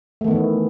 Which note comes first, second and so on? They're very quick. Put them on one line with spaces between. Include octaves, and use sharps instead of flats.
A3 D#3 B3 E3